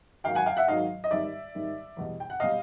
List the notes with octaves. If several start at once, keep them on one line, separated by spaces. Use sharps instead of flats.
G#2 D#3 F#3 F5 G5
F#5 G#5
F5 G5
E5 F#5
G#2 D#3 F#3 D#5 F5
D#5
G#2 D#3 G3 D5 E5
G#2 D#3 G3
E2 B2 G3
G5
F#5
B2 G3 D#5 F5